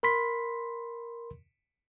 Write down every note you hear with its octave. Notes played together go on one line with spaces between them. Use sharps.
A#4 B5 C6 B6